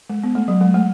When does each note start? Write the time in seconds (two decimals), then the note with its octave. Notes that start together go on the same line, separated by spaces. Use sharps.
0.10 G#3
0.24 B3
0.35 A3
0.48 F#3
0.61 G#3
0.74 A3